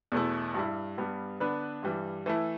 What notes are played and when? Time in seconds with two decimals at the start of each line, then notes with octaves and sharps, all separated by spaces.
0.12 E2 B2 A3 E4
0.54 G2 G3 E4
0.98 G2 G3 B3
1.40 D3 B3 D4 B4
1.83 G2 E3 G3
2.26 E3 A3 E4